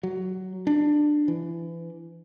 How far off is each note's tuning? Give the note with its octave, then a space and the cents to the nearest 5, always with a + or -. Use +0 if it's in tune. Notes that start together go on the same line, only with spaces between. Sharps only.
F#3 +10
D4 +15
E3 +25